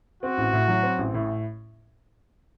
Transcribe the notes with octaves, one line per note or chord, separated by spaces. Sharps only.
C4 F#4
A1
A2
F#3
C4
A1
A2